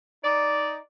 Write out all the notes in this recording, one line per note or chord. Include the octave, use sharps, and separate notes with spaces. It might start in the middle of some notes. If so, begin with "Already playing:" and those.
D#4 D5